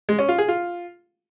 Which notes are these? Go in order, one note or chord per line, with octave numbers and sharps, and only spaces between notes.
G#3
C#4
F4
G#4
F4